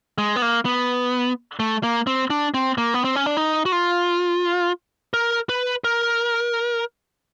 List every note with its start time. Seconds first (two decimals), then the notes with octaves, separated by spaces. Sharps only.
0.18 G#3
0.36 B3
0.42 A#3
0.65 B3
1.60 A3
1.83 A#3
2.07 C4
2.30 D4
2.54 C4
2.78 A#3
2.94 B3
3.04 C4
3.16 C#4
3.26 D4
3.37 D#4
3.66 F#4
3.72 F4
5.14 A#4
5.49 B4
5.84 A#4